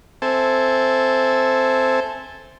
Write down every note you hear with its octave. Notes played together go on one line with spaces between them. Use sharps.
C4 A4 C5 E5 G#5 A5